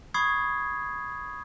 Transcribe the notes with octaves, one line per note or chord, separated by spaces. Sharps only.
B5 C#6 D#6 G#6 C7